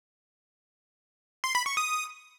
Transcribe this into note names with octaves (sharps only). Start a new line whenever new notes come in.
C6
B5
C#6
D#6